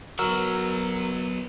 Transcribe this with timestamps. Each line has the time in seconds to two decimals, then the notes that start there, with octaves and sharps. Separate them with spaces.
0.19 F#3 B3 F#4 A#4 E6